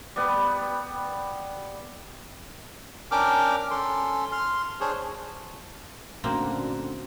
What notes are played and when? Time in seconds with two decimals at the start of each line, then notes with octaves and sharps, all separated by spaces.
0.16 G3 B3
3.11 C#4 D4 A#4 G5 D6 F6
3.71 C#4 A4 C6
4.32 C6 F6
4.81 D4 G#4 C5 C#5
6.24 A#2 D3 A3 A#3 C4 C#4 F#4